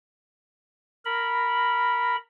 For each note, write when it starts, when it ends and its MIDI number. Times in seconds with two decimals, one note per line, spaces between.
1.05 2.16 70
1.05 2.16 83